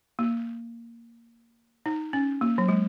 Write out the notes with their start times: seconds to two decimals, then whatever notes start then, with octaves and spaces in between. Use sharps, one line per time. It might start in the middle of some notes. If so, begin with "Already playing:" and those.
0.19 A#3
1.86 D#4
2.13 C#4
2.41 A#3
2.58 F#3
2.68 G#3